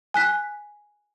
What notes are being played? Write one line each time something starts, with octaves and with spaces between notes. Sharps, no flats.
G#5 F#6 B6